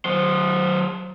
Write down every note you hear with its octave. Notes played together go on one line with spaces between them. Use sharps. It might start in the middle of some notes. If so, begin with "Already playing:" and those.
F#3 C5